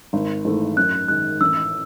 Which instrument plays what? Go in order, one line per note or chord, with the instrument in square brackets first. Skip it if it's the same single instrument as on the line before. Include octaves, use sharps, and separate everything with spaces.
[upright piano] G#1
G#2 E3 A3
[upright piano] F#2 [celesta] F#6
[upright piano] D#3 G#3 [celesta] F#6
[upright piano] A1 [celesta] E6